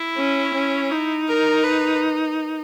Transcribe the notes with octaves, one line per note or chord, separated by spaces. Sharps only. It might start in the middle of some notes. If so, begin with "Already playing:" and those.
Already playing: E4
C#4
C#4
D#4
A#4
B4